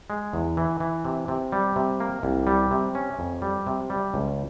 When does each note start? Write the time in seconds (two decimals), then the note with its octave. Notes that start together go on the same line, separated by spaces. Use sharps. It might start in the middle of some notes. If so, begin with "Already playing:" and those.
0.10 G#3
0.33 E2
0.57 E3
0.80 E3
1.05 C3
1.28 C3
1.52 G3
1.76 C3
2.00 A#3
2.23 C2
2.47 G3
2.71 C3
2.95 C#4
3.19 F2
3.42 G3
3.67 C3
3.90 G3
4.14 C#2